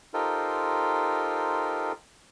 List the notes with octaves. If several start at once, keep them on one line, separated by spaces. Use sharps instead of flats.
D#4 F4 G4 A4 A#4 C5